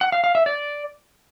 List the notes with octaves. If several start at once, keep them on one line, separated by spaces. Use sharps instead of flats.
F#5
F5
F5
E5
D5